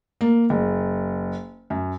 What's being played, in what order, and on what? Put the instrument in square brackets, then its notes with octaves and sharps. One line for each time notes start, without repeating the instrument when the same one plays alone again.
[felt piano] A#3
F#1
F#2